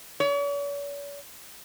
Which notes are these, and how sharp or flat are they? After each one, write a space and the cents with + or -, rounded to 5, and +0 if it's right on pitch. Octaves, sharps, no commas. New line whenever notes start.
C#5 +45